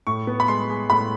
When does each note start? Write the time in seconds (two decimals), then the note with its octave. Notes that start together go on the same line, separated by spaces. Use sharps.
0.07 A2 C#6
0.27 B3
0.40 B5
0.48 G#3 C6
0.69 G#3
0.90 A2 B5